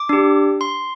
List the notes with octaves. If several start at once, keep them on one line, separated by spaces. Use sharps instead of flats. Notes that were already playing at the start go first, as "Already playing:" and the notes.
Already playing: D6
D4 G4
C6